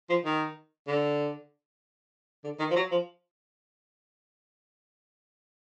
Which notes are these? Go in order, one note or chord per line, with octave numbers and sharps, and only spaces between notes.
F3
D#3
D3
D3
D#3
F3
F#3
F3